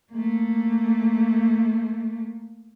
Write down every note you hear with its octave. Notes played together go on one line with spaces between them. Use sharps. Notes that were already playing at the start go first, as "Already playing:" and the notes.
A3 A#3